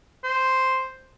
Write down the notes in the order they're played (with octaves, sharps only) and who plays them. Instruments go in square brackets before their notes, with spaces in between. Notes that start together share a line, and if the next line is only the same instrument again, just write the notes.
[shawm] C5